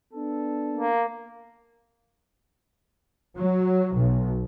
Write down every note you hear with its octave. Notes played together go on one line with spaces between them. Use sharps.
B3 D4 A4
A#3
F#3
B1